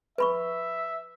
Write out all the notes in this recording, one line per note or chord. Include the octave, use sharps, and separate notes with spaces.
B4 E5 B5 C#6